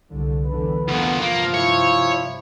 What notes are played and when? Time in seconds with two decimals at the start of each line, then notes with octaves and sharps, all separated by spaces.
0.11 C2 D3
0.45 E2 D3 B4
0.88 D2 A#2 B3
1.22 G2 C3 F3 A#3 F4
1.55 E4 C#5